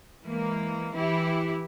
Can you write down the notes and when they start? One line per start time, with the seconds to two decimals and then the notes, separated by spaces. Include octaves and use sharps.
0.24 E3 G#3 A#3
0.94 E3 E4 G4